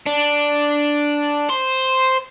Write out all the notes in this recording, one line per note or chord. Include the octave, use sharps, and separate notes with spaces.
D4
C5